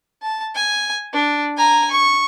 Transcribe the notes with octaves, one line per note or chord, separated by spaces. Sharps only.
A5
G#5
D4
G#5 A#5
C#6